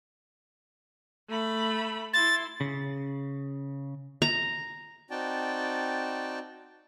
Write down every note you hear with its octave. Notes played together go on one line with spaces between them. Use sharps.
A3 B5
E4 C6 A6
C#3
A#5
C4 D#4 F#4 D5 G5 A5